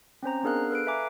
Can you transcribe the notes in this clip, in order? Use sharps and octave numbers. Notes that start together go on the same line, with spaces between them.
C4 C#4 C5 A#5
B3 D4 G#4 A#4 F5 F#6
A4 B4 F#6 D7
B4 E5 F5 G#5 A#5 D6